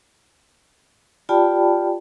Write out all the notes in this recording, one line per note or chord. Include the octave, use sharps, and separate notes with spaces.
F4 G4 D5 G5 A5 B5